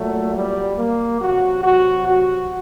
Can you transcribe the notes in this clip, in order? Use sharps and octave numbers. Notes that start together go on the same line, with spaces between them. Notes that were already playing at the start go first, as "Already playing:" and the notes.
Already playing: A#2 F#3 A3
G3
A#3
C3 F#3 F#4
F#4
F#4